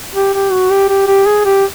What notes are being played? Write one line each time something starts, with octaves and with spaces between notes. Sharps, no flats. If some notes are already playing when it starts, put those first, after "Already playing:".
G4
G4
F#4
G4
G4
G4
G#4
G4